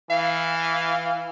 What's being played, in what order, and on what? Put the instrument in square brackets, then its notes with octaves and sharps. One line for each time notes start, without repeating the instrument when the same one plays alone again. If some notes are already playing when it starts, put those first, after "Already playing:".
[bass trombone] E3 [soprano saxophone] F5